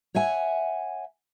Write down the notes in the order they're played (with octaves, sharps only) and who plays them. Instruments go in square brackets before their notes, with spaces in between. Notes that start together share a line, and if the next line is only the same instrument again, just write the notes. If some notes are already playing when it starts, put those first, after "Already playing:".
[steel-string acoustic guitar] C#5 E5 F#5 G#5